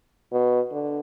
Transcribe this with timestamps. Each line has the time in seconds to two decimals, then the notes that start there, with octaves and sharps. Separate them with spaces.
0.32 B2
0.72 D3